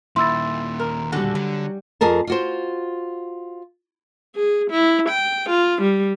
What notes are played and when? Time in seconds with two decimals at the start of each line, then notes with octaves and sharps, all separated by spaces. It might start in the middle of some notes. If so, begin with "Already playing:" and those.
0.16 D#2 A#2 E4 C6 E6 A6
0.80 A#4
1.12 D3 G3 F#4 A4 G#5
1.35 D3 F#3
2.01 F2 G#4 A#4 A5
2.27 F4 F#4 C5
4.36 G#4
4.71 E4
5.09 G5
5.50 F4
5.82 G3